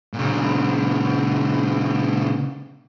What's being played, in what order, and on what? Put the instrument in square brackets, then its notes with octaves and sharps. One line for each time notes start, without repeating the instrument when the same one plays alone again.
[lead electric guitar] A#2 C#3